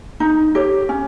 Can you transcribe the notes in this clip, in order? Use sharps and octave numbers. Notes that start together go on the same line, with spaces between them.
D#4
G4 C#5
C#4